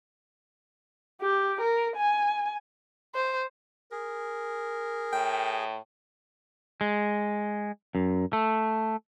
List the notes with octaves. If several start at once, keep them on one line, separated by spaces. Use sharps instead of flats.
G4
A#4
G#5
C5
G#4 A#4
A2 G5
G#3
F#2
A3